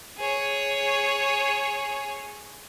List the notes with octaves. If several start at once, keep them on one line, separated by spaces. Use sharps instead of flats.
G#4 C#5